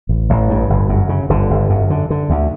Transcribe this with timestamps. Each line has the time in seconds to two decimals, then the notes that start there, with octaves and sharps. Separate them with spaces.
0.09 A1
0.29 A1
0.49 G2
0.70 G1
0.89 F#2
1.09 C#3
1.29 G1 D3
1.50 G1
1.70 F#2
1.90 D3
2.10 D3
2.30 D2